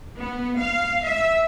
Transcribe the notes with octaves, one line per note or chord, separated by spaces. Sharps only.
B3
F5
E5